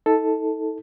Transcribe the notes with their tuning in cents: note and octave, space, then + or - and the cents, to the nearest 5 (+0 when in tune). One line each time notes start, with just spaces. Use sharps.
D#4 +40 A4 +0